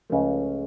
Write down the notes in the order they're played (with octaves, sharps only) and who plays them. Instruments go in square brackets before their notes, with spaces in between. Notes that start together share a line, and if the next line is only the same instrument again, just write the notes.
[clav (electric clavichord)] C#2 C#3 F3 A3